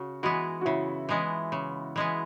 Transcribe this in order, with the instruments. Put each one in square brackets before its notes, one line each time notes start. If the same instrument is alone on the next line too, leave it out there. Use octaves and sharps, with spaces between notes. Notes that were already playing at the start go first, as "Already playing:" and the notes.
Already playing: [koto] C#3 [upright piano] F#4
[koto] E3 G#3 B3 [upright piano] F#4
[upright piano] F#4
[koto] C#3 [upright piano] E4
[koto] E3 G#3 B3
C#3
E3 G#3 B3